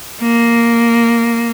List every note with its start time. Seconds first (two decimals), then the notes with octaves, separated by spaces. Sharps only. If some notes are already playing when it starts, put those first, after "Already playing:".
0.21 A#3